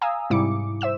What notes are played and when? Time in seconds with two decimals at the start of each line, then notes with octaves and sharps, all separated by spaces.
0.02 F5 G#5 A#5 D#6 E6
0.30 G#2 C3 G3 E4 D6 C#7
0.81 C5 E5 E6 E7